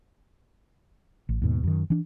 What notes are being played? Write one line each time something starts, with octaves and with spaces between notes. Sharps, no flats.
A1
D#2 G#2 B2
F#2 D#3
E3 D4